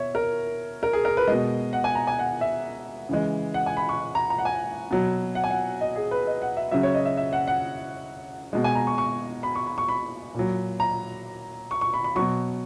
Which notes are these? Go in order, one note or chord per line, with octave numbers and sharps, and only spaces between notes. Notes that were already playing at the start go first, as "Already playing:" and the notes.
Already playing: B2 C#5 E5
A#4
A#4
G#4
A#4
B4
B2 G#3 D#5
F#5
G#5
A#5
G#5
F#5
E5
C#3 E3 G#3
F#5
G#5
B5
C#6
A#5
A#5
F#5
G#5
B2 F#3
F#5
G#5
F#5
D#5
G#4
B4
D#5
F#5
E5
C#3 F#3 E5
C#5
D#5
E5
E5
F#5
F#5
B2 G#3
G#5
A#5
C#6
C#6
B5
C#6
B5
C#6
B5
A#2 F#3
A#5
C#6
C#6
B5
B5
B2 F#3 C#6